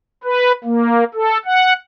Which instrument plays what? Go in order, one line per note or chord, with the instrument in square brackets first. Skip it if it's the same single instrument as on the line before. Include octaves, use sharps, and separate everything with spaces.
[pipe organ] B4
A#3
A4
F#5